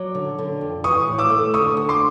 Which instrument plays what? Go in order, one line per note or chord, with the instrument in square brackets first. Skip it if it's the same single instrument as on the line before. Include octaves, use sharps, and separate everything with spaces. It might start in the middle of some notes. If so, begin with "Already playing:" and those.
Already playing: [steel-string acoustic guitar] F#3 [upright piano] D6
[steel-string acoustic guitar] D3
D3
F2
[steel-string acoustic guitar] E3 [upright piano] C#6 D#6
[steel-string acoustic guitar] A2
[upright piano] D6 E6
[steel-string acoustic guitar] A3
[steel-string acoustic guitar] D3 [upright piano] C#6 D#6
[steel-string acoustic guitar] D2
[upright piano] C6 D6